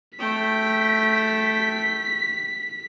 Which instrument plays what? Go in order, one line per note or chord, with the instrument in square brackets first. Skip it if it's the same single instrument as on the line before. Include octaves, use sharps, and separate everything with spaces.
[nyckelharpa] A3 G5 [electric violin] B6